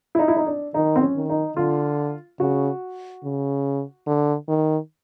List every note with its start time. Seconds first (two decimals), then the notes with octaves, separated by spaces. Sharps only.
0.15 E4
0.19 D#4
0.28 E4
0.37 D#4
0.47 D4
0.74 D#3 D#4
0.96 C4
1.02 C#4
1.15 D#3
1.29 D#4
1.57 D3 F4
2.40 C#3 F#4
3.24 C#3
4.06 D3
4.48 D#3